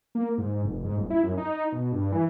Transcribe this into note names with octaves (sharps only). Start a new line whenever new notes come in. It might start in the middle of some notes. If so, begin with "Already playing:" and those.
A#3
G#2
F1
G#2
D#1
E4
F#2
D#4
B2
G2
E3